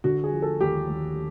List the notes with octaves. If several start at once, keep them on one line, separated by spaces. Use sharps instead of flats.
D3 F#4
G#4
F3
A4
D#2 G4
D#2